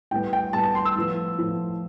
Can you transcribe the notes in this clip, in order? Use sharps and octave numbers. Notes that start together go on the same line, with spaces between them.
A2 G3 B3 G5
G5
A2 G3 B3 A5
A5
C6
E6
A2 F3 B3
A2 F3 B3